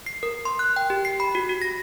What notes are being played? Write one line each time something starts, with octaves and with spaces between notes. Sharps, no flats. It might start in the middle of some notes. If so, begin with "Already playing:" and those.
C7
A#4
C6
F#6
G5
G4
C7
B5
F#4
F#4
A#6